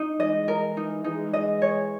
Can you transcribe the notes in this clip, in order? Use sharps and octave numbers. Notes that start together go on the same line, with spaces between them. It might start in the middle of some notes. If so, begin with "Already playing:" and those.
Already playing: D#4
E3 G#3 D#5
A#4
D#4
E3 G#3 D#4
D#5
C#5